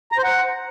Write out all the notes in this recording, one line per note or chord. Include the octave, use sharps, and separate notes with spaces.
A#5
C5
F#5